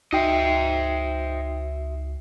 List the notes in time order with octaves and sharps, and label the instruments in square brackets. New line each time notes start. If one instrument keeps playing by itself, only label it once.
[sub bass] C#2 [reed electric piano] D#4 G5 [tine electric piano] F#4 E5 [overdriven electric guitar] C5 D#5